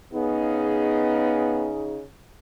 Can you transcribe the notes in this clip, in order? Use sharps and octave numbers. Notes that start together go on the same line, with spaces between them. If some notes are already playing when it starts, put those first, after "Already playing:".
C#3 B3 D#4 G#4